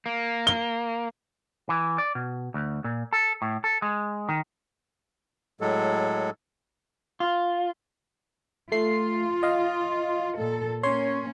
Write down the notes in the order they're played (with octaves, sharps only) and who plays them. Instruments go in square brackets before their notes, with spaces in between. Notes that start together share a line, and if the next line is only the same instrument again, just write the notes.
[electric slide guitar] A#3
[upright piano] G7
[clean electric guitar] E3
D5
B2
D2
A#2
A4
A2
A4
G#3
D#3
[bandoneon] A2 F#3 G#3 A4
[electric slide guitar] F4
[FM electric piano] A3 C7 [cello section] F4
[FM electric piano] D#5 F5
[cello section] A#2 A4
[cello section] A#3 C#4 [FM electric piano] C#5 C6